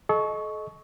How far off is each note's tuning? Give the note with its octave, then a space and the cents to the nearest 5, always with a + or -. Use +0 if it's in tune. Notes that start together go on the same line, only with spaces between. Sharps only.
A4 -40 D#5 +0 C#6 +0